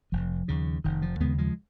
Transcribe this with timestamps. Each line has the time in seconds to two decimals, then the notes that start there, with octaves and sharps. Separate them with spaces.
0.12 F1 F3
0.48 D#2 C#3
0.84 F1 D#3
1.02 F3
1.20 D#2 C#3 G#3 B3
1.38 F3 G#3